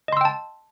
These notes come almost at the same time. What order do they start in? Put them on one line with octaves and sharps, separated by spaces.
D#5 C6 E6 G5 A5